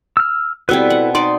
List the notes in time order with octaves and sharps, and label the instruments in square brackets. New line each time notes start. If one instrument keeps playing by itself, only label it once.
[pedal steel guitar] E6 F6
[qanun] B2 G3 C4 [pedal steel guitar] E4 A4 B4
[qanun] F#5
[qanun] D#4 D5 D6 [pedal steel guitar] C6